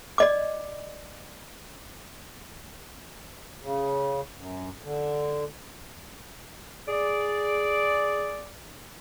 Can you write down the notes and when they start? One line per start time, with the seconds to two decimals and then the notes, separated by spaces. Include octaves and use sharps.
0.18 D5 D#5 D6
3.62 C#3
4.36 F#2
4.83 D3
6.88 G#4 D5